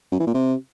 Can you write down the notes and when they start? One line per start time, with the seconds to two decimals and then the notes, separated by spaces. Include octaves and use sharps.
0.12 F#2
0.20 E3
0.27 A#2
0.34 C3